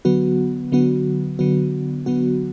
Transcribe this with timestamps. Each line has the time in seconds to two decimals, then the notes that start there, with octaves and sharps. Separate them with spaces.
0.05 D3 F#3 B3 F#4
0.72 D3 F#3 B3 F#4
1.39 D3 F#3 B3 F#4
2.06 D3 F#3 B3 F#4